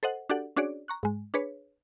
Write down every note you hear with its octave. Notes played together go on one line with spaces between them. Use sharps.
A4 C5 D#5 F#5
D4 F#4 G4 A4 D5 F#5
C#4 D4 F#4 G#4 C#5 D5
A#5 C#6 F#6
G#2 G#3
D4 G#4 B4 C#5